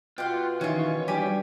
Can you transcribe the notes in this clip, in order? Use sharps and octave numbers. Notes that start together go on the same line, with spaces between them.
B2 F4 G4 F#5
D#3 E3 C#4 F4 C#5
G3 D4 G4 G#5 B5